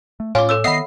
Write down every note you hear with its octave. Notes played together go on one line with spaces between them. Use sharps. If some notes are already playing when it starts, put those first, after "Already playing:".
A3
A2 C#4 F4 G#5 D6
A4 C#5 E6
D#3 B3 D#5 E5 F#5 B5 C7